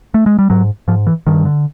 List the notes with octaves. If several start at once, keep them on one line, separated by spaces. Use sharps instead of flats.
A3
G#3
G3
G#2 F#3
G#2 F3
E3
G2 D#3
D3